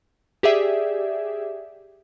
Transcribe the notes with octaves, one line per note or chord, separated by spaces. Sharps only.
G4 G#4 D5 E5